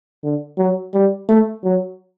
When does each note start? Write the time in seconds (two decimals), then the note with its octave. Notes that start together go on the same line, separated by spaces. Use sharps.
0.24 D3
0.58 F#3
0.94 G3
1.29 A3
1.64 F#3